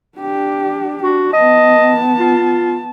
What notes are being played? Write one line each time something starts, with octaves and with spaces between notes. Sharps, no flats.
D4 G4
D4 F#4
B3 D#5 A5
F4